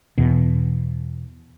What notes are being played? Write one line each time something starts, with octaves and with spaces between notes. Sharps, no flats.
E2 B2